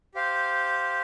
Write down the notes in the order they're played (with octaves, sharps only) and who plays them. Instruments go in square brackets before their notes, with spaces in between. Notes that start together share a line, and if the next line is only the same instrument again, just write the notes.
[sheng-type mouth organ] G4 C5 F5